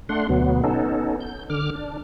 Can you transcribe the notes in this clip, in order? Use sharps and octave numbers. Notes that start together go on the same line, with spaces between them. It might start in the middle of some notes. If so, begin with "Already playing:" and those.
A3 D4 F#5 C6
D2 B2 F#3 B3
B3 C#4 D#4 A4
G6
D3 D6 F6
D4